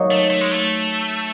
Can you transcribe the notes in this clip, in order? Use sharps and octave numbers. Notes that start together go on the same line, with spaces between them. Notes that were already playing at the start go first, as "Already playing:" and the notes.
Already playing: F#3 A#3 D#4 F#4
A3
A3
G#3
A3